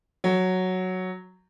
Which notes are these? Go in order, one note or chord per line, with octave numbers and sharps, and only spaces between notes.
F#3